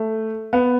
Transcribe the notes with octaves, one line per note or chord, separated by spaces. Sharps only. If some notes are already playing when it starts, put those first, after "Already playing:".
Already playing: A3
B3